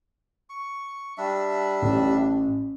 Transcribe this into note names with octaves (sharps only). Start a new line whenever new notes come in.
C#6
G3 D4 E5
A1